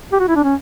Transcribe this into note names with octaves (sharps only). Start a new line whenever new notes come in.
G4
F#4
E4
D4
C#4